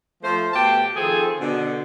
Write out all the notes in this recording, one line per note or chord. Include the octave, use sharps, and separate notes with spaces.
F3 A3 C5
B2 A3 G4 G5 A5
D#3 F3 C4 G#4 A4
B2 D3